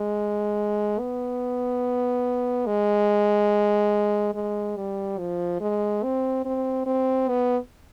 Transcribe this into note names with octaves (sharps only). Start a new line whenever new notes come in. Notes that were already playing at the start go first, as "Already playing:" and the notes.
Already playing: G#3
B3
G#3
G#3
G3
F3
G#3
C4
C4
C4
B3